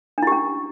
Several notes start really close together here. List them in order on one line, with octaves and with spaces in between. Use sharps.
D4 E4 G4 C#4